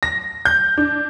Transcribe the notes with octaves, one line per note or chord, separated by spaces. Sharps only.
A#6
G6
D4